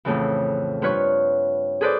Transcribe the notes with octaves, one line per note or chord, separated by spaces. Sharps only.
F2 A2 C#3 E3
G2 F4 B4 C#5 C#6
G#4 A4 B4 C5 D5